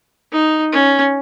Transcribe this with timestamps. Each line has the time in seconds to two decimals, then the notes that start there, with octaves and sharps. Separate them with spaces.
0.33 D#4
0.73 C#4